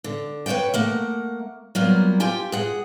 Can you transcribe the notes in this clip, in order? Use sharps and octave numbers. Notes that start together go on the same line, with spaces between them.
D3
B4 C#5 D5 F#5 G5
A3 A#3 F#5
F#3 G3 A#3 B3 F4
F4 G4 G5 G#5
G#4 F#5